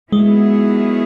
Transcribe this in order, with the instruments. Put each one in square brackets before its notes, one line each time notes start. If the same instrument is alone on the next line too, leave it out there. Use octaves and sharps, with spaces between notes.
[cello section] D#3 F#3 B3 E4 G#4 [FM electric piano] G#3